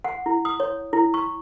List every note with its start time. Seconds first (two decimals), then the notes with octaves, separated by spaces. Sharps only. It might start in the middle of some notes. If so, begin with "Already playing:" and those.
0.04 F#5
0.26 E4
0.45 D#6
0.60 C#5
0.93 E4
1.14 C#6